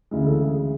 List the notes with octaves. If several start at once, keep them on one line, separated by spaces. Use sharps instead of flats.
D2 C#3 E3 G#3
A4
G#4